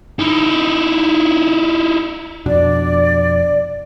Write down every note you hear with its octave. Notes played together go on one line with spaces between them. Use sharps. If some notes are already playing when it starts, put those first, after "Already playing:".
D#4 E4
F2 B2 D4 D5